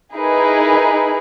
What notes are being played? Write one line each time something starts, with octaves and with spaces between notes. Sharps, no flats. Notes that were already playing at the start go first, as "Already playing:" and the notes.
D#4 E4 G#4 A#4 B4